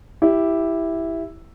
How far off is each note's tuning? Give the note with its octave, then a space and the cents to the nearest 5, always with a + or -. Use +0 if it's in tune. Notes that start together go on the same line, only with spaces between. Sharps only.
E4 +0 G4 +0